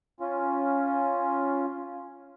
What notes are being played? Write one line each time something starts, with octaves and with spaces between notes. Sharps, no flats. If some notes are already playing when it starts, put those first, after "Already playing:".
C#4 F4